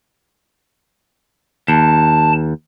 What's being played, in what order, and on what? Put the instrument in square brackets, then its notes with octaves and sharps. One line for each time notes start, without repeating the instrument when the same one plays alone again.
[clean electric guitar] D#2 [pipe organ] A5